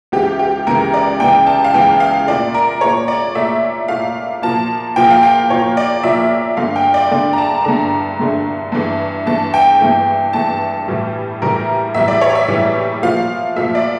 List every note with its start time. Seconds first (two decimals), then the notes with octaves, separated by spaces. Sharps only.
0.12 C#2 C#3 E3 G4
0.39 G4
0.67 C#2 C#3 E3 A#4
0.94 D5
1.20 C#2 C#3 E3 G5
1.47 A5
1.64 F5
1.74 C#2 C#3 E3 G5
2.00 F5
2.27 A#2 A3 D5
2.54 A#4
2.81 A#2 A3 C#5
3.08 D5
3.35 A#2 A3 E5
3.88 A#2 A3 F5
4.42 A#2 F3 A#3 A5
4.96 A#2 F3 A#3 G5
5.10 F5
5.23 G5
5.50 A#2 F3 A#3 C#5
5.77 D5
6.03 A#2 F3 A#3 E5
6.57 G2 D3 A3 F5
6.76 G5
6.94 D5
7.11 G2 D3 A3 D5
7.33 A#5
7.38 A5
7.65 G2 D3 A3 A#5
8.19 G2 D3 A3
8.72 G2 E3 A3
9.26 G2 E3 A3 A5
9.54 G5
9.81 G2 E3 A3
10.33 G2 E3 A3 A5
10.88 A2 E3 G3
11.42 A2 E3 G3 A#4
11.94 A2 E3 G3 E5
12.08 D5
12.21 C#5
12.35 E5
12.48 A2 E3 G3
13.03 A#2 F3 A3 F5
13.56 A#2 F3 A3 E5
13.75 D5